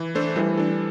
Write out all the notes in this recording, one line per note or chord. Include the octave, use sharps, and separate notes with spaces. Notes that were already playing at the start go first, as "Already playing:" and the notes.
Already playing: E3
A3 D4 A4 C5
E3 G3
D4 A4